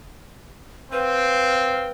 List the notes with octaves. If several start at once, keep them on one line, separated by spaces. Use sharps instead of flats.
C4 B4 F5 G5